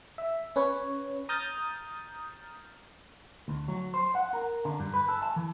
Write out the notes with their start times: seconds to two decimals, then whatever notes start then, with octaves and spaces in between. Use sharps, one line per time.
0.18 E5
0.56 C#4 B4 C#5
1.29 A#5 D#6 F6 G6 A6
3.48 D2
3.68 F#3
3.94 C5
4.15 F#5
4.33 A#4
4.65 D3
4.80 G2
4.94 B4
5.08 A4
5.23 A5
5.36 E3